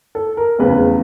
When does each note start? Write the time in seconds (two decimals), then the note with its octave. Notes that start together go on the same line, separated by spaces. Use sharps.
0.15 A4
0.37 A#4
0.59 F1 E2 C#3 B4